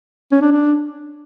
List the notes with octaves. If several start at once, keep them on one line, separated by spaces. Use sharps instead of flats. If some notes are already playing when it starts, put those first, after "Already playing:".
C#4
D4
D4